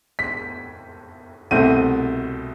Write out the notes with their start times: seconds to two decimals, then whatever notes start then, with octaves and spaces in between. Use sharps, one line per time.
0.19 B6
1.51 C2 B2 A3 C4 D#7